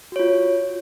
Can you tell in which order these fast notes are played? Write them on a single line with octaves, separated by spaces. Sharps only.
F#4 C#5 F4